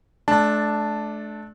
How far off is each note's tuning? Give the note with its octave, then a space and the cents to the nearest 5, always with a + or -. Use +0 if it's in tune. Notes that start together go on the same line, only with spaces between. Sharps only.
A3 -35 D4 +0 A5 +0